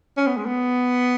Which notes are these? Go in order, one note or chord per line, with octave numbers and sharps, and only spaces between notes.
C#4
B3
G#3
B3